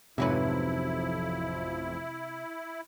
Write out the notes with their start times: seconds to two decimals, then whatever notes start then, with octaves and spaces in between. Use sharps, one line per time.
0.18 A1 F2 G#2 C3 F3 F#3 E4 B4